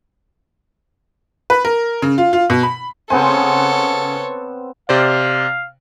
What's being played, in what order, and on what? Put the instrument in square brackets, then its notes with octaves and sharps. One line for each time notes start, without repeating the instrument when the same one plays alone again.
[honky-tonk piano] B4
A#4
C#3
F4
F4
B2
B5
[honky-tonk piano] C#3 G#5 [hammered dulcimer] B3 C4 C5 [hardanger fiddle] A4 C#5
[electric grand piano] C3 C5 D5 [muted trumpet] F5